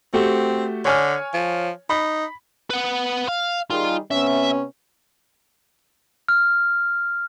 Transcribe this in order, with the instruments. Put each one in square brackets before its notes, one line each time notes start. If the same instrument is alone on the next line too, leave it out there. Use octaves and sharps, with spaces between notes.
[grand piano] A3 F#4 G4 [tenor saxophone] C4
[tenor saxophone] D3 [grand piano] C#5 G#5 F6
[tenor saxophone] F3
[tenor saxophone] D#4 [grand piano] B5
[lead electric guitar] B4 F#5
F5
[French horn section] D#3 G3 G#4 [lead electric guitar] F4
[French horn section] C3 B3 C#4 [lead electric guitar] E5
[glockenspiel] F6